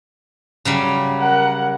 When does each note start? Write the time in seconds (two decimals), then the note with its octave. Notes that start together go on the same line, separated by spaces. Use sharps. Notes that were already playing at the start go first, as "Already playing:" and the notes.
0.65 C#3 F#3 G3
1.21 A#4 F#5